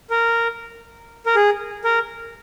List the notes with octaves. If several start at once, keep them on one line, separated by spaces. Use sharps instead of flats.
A#4
A#4
G#4
A#4